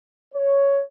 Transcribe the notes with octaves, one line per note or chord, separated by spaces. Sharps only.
C#5